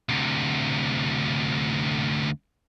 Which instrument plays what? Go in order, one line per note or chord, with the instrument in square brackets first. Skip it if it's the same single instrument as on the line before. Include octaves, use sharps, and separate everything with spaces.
[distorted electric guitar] D2 C3